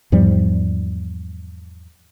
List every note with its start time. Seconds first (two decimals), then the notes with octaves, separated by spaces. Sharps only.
0.12 E2 G#2 F3 G3